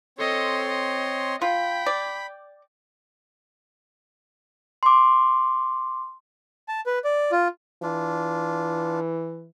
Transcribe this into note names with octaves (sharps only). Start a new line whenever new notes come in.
C4 A4 C#5 D#5 C6
D#5
F4 G5 B5
D5
C6 D6
A5
B4
D5
F4
E3 D4 F4